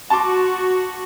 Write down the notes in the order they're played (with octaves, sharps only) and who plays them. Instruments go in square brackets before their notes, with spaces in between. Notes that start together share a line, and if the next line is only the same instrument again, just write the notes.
[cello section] F#4 [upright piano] A5 C6 D6